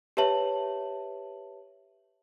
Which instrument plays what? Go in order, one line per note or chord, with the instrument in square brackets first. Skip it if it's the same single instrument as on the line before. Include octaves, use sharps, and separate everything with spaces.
[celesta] G4 B4 C#5 E5 A5 F#7